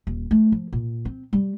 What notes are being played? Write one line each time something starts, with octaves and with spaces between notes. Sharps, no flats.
D#1
A3
F3
A#2
C4
G3